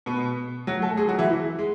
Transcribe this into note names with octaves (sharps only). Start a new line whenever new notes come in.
B2 B3
F#3 F#4
A3 A4
G#3 G#4
F#3 F#4
E3 E4
G#3